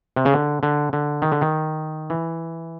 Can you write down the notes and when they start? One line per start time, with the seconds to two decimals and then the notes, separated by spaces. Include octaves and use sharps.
0.16 C3
0.25 C#3
0.34 D3
0.63 D3
0.93 D3
1.22 D#3
1.32 D3
1.41 D#3
2.10 E3